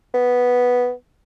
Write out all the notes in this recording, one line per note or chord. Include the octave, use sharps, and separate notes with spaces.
B3